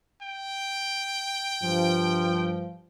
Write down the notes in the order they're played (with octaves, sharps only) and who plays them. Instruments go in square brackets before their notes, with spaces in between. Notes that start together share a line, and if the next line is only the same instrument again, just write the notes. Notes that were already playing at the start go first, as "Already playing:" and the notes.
[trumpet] G5
[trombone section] G2 F3